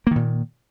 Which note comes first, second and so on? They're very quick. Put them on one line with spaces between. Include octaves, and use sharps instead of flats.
A#3 D#3 A#2